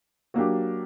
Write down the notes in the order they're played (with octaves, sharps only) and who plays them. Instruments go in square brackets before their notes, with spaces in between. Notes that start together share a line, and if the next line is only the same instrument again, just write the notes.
[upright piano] F#3 A#3 D4 G4